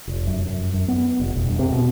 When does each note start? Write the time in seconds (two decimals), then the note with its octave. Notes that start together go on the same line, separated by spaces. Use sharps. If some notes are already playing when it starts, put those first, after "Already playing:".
0.08 F1
0.27 F#2
0.46 F#2
0.74 F#2
0.88 B3
1.19 F1
1.35 E1
1.48 G2
1.59 C3
1.71 B2